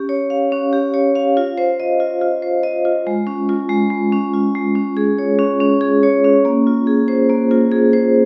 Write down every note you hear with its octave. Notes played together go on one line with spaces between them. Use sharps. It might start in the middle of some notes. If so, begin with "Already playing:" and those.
Already playing: C#4 G4
C#5
F5
C#4
G4
C#5
F5
F4
C5
D#5
F4
F4
C5
D#5
F4
G#3
C#4
F4
G#3
G#3
C#4
F4
G#3
C#4
G#4
C#5
C#4
C#4
G#4
C#5
C#4
A#3
F4
G#4
C5
A#3
F4
G#4
C5